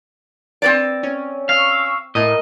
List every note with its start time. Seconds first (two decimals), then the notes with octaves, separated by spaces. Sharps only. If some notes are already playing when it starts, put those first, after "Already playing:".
0.62 C4 B4 D5
1.03 C#4
1.49 F5 C#6 E6
2.15 A2 A#4 D#5